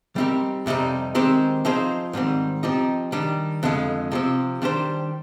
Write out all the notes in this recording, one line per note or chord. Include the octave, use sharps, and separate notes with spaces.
G3 C4 D#4 G4 A#4
F2 C3 G3 C4 D#4
D#3 G#3 C4 G4 C5
F3 C4 D#4 G#4 C5
G#2 D#3 G3 C4
F3 C4 D#4 G4
D#3 G3 D4
F2 D3 F3 G#3
C3 F3 C4
D#3 G3 D4 G4 C5